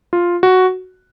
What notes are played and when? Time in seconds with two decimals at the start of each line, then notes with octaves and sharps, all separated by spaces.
0.13 F4
0.43 F#4